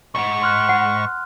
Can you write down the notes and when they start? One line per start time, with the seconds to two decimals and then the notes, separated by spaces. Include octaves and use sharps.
0.15 B1 G#2 C#6
0.42 C6 F6 F#6
0.69 F#5